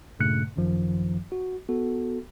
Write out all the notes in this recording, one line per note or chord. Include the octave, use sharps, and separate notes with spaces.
G2 A#2 C#3 A3 F#6 C#7
G#1 F#2 D#3 F3
F#4
B3 F#4 A4